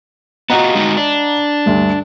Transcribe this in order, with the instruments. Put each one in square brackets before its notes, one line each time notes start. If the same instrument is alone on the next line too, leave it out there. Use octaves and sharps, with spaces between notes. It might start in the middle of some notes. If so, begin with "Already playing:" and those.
[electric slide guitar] B3 F4 F#4 [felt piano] D#5 F#5 A#5
[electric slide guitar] G#3 D#4 F#4
D4
[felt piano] D2 G2